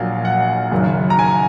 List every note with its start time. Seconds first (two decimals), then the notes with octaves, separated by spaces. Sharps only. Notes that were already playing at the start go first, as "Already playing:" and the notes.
Already playing: A#1 A#2 F#3 F5
0.25 F#5
0.72 F#1 F#2 D#3 F#3
1.10 A#5
1.19 G#5